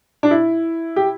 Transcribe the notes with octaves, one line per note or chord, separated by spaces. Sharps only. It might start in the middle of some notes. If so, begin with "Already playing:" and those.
D4
E4
G4